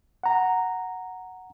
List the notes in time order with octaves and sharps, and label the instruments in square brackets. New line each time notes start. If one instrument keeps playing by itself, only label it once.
[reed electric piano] F#5 A#5